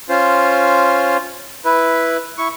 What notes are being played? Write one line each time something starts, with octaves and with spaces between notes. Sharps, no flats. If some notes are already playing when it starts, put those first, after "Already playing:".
C#4 F4 C5
E4 B4
E4 C#6